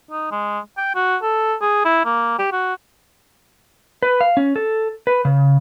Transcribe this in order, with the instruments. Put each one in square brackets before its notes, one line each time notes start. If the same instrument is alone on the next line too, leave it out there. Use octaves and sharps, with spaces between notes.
[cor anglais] D#4
G#3
G5
F#4
A4
G#4
E4
A#3
G4
F#4
[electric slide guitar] B4
F5
C#4
A4
B4
C#3